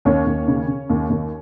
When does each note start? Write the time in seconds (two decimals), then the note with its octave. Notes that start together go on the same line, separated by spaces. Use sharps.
0.05 D#2 C#4 C#5
0.26 D#2
0.48 C#3
0.68 C#3
0.90 D#2
1.09 D#2